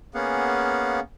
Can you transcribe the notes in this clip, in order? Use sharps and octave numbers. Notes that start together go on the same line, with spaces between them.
A#3 B3 C#4 G#4 F5 F#5